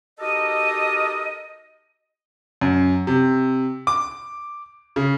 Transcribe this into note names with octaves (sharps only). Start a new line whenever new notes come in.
D#4 F#4 G4 A4 A#4 D#5
F#2
C3
D6
C#3